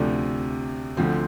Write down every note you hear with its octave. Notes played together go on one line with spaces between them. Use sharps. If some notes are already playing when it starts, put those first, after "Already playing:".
Already playing: D2 C3 F3 A3 D4
D2 D3 F3 C4